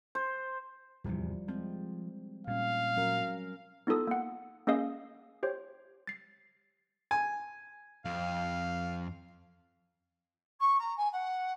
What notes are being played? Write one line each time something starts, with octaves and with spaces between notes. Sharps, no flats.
C5
D1 E2 C3 F3 G3 E4
F3 G#3 C4
A#2 G3 C#4 F5
F#3 C#4 A#4
B3 D#4 F4 A4 D#6
A#3 F#5
A#3 C#4 G#4 D#5 F5 D#6
G4 C5 C#5
A6 C7
G#5
F2 F5
C#6
A#5
G#5
F#5